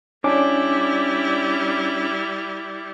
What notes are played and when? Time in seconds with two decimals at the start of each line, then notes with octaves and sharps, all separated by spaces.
0.24 G3 C#4 D4 E4 D6